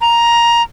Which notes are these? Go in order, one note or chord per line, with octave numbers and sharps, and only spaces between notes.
A#5